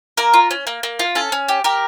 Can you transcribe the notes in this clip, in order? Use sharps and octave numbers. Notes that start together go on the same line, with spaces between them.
A#3 A#4
F4
C#4
A#3
A#3
F4
C#4 A4
C#4
G4
G4 A#4